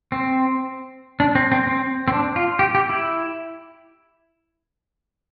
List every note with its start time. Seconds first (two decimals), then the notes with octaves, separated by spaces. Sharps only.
0.12 C4
1.20 D4
1.35 C4
1.52 C4
1.67 C4
2.08 C4
2.13 D4
2.36 F4
2.59 G4
2.75 G4
2.89 E4